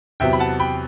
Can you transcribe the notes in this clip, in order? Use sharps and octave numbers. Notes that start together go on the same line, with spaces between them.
E2 C3 F#3 E5 G5
B5
F#5 A5
G5 B5